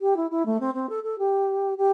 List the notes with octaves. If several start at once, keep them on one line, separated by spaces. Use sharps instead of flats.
G4
E4
E4
A3
C4
C4
A4
A4
G4
G4